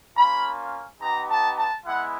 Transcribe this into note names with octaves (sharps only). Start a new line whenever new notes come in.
A#3 C#4 F4 B5
B3 D#4 G4 A#5
A5
A5
G#3 B3 E4 F#5